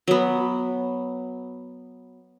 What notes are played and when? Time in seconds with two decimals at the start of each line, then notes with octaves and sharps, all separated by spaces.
0.08 F#3 B3